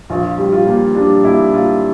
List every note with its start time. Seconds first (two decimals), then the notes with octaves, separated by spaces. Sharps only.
0.10 A#1 F4
0.38 G3
0.52 F4
0.66 A#2
0.95 G3 D4
1.24 A#2 E4
1.53 A#2 F4